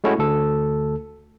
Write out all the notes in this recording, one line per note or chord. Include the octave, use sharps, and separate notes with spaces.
G#3 A3 C#4 E4 F#4
D2 A4